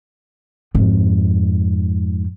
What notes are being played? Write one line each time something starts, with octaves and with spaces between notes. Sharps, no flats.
F2 G#2